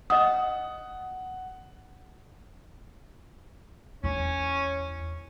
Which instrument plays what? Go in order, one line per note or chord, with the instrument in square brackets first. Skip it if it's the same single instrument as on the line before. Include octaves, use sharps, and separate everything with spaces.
[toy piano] D#5 D#6 [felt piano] F#5
[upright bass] E2 E4 [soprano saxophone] C#4